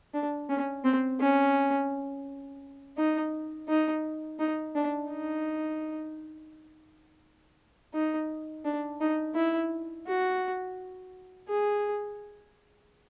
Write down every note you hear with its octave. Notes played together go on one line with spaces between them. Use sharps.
D4
C#4
C4
C#4
D#4
D#4
D#4
D4
D#4
D#4
D4
D#4
E4
F#4
G#4